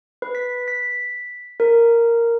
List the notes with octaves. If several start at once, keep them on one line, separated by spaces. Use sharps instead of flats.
B4
B6
B6
A#4